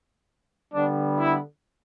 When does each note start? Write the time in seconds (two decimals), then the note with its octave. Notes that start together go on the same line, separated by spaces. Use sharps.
0.72 D3 G3 B3 D4
1.18 E4